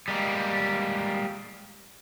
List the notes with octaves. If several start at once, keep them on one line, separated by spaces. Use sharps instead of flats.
G3 G#3 A#3